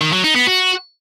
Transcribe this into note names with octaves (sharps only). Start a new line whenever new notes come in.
D#3
F#3
D#4
B3
F#4